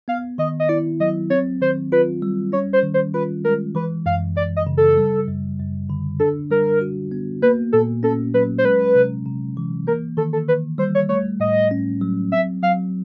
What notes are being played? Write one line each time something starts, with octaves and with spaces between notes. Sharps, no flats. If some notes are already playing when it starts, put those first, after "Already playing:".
B3 F5
D#3 D#5
D#5
E4 D5
F#3 D#5
C4 C#5
D#3 C5
F4 B4
G3
C#4 C#5
C5
D#3
C5
F4 B4
G#3 A#4
E3 B4
F#2 F5
F#2 D5
D#5
C#3
A4
G3
F#2
F#2
D3
D4 A4
G3 A#4
F#4
B3
A#3 B4
A#2 A4
C#4 A4
F#3 B4
C5
G#3 B4
C3
C3
E3
A#3 A#4
D#3 A4
A4
D#3 B4
G3 C5
C#5
A3 C#5
A2 D#5
C#4
F#3
C4 E5
F#3 F5